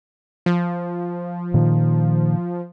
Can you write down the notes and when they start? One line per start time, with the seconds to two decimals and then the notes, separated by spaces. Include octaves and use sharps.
0.46 F3
1.54 A#2 D#3